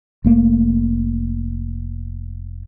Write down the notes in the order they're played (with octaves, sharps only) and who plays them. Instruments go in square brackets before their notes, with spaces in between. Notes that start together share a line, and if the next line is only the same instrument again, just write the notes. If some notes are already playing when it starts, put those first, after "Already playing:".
[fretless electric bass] F1 A3 A#3